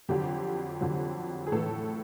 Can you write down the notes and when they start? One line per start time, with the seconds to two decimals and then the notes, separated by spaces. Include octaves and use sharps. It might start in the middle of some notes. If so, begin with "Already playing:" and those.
0.09 F2 D3 F#3 G4
0.81 F2 D3 F#3
1.47 G#4
1.52 A2 E3 A4